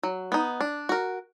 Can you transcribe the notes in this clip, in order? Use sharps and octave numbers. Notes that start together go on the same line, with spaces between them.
F#3
B3 D#4
D4
F#4 A#4